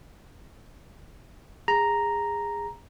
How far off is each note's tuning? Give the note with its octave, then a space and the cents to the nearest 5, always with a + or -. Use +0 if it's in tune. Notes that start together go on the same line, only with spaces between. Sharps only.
G#4 -20 A#5 +0